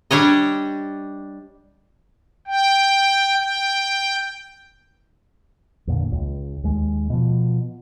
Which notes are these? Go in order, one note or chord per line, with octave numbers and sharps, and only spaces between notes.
G3 D4 C#5 D#5
G5
G5
E2 A#2 D3
C#2
D#2 G#3
B2 F3